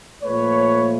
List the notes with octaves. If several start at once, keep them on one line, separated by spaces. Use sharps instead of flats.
A#2 F3 A3 B4 C#5